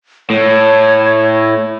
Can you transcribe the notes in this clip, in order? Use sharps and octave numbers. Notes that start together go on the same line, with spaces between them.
A2 C#5